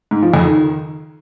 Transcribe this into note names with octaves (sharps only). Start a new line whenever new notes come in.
G#2
F3
F2
D#3